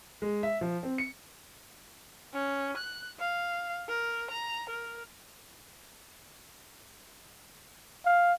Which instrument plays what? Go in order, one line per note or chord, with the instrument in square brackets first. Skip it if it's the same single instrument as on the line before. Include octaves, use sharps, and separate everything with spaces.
[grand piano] G#3
E5
F3
C4
C#7
[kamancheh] C#4
F#6
F5
A#4
A#5
A#4
[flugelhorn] F5